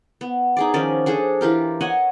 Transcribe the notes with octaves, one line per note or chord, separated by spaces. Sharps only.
B3
D#4 G#4 D5
D#3 F3 C#4 D5
D4 G#4 A4 C5
E3 F4 G4 A#4
C#5 D#5 F#5 G#5